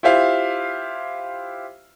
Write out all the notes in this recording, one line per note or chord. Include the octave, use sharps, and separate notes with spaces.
E4 F4 G4 C5 E5 F5